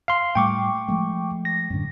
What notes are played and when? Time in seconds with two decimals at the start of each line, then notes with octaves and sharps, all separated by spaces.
0.08 F5 C6
0.35 A2 G3 A3 G5 C#6 D6
0.88 F3 G#3 A3
1.45 A#6
1.70 F#2 A2 D3